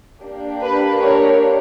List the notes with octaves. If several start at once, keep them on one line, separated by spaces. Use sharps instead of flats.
A#3 D4 G4
B4
A#4 C#5